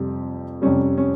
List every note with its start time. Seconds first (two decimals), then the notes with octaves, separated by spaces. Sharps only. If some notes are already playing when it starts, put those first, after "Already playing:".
Already playing: F2 C3 G3 C4
0.62 F2 C3 G3 C#4
0.98 C#4